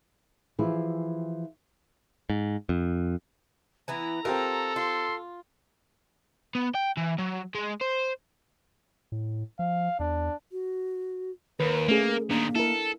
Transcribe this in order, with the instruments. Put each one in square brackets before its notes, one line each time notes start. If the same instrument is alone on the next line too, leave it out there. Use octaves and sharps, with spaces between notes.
[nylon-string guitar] E3 F3 E4 F4 G4 G#4
[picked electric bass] G#2
F2
[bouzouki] E3 B3 E4 [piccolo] A#5
[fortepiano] C4 G4 A#4 [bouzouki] F4 [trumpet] A4
[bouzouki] F4 [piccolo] C6
[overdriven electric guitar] B3
G5
E3
F#3
G#3
C5
[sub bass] A2
[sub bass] F3 [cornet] F5
[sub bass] E2 [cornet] D4
[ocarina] F#4
[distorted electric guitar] D#2 [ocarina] A#4 [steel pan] B4
[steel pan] A3 C#4 G#4 [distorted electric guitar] A#3
[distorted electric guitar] A#2 D#3 [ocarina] A#3 [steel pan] D4
[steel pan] E4 A#4 [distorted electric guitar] A4